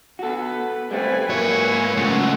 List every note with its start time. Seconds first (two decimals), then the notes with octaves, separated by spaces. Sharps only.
0.19 B3 F#4 A4 B4
0.91 G3 A3 C4 B4 G#5
1.29 G#2 F#3 A3 A#3 C#5
1.97 F#2 A#2 C#3 G#3 A3 F#5